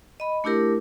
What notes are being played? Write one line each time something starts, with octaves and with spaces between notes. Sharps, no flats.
D#5 B5
A3 D4 E4 G4 A#4